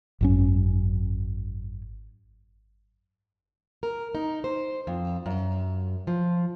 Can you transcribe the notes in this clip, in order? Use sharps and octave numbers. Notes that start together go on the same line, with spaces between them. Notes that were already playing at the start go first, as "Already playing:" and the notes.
G#1 F#2 C#4
A#4
D#4
C5
F2
F#2
F3